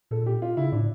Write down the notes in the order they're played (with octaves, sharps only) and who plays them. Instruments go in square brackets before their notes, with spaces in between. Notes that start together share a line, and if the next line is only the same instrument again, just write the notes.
[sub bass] A#2 [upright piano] A4
[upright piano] G4
F4
[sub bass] C#3 [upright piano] E4
[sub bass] A2 [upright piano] D4